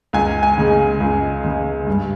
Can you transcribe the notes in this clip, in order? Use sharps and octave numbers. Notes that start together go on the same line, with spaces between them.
C#2 G#5
G#5
C#3 G#3
C#2
C#3 G#3
G2